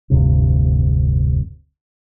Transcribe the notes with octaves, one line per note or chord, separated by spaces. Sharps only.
F1 D2 G2 C3